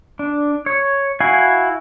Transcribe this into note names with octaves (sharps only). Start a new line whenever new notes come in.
D4
C#5
E4 F#4 F5 G#5